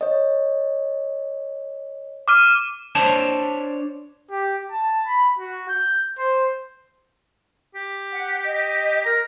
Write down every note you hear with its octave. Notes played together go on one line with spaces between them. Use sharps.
C#5 D#5
D6 F6 D#7
D4 C5 C#5 A5
G4
A5
B5
F#4
G6
C5
G4
F#5
D#5
A#4 A#5